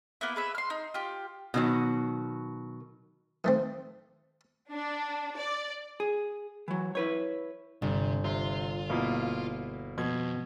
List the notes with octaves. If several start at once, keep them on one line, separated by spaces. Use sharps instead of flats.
A#3 B3 E4
G#4 B4 E5
C6 F6
D#4
F4 G4
B2 D#3 F#3
D#3 A3 C4
D4
D5
G#4
E3 F#3
E4 B4 C#5
G1 C3
C3 F4
B2 A#3 E4
F2 B2 G#6